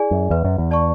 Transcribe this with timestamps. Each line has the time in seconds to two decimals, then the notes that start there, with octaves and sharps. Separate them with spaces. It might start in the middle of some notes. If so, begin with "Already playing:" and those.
Already playing: E4 G#4 D5 G#5
0.11 F#2
0.30 E2 B4
0.44 F#2
0.58 E2
0.71 D5 A5 C#6